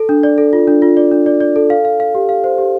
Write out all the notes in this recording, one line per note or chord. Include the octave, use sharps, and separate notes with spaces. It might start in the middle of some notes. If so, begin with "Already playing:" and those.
Already playing: A4
D4
D5
A4
F4
D4
F4
D5
D4
D5
D5
A4
F5
F5
F5
G4
F5
C5
G4